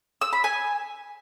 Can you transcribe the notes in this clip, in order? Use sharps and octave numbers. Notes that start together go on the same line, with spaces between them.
E6
B5
G#5